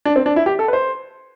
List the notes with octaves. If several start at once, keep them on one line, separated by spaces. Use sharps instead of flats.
D4
C4
D4
E4
G4
A4
B4
C5